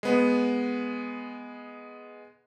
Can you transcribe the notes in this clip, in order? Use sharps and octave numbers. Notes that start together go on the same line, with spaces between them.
G#3 B3